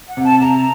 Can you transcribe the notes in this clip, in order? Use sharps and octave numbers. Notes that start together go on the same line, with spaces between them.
F#5
C3
A5
C3 A#5